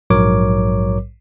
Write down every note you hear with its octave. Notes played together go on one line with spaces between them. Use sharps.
A#1 G#2 F#3 A#4 C#5 D6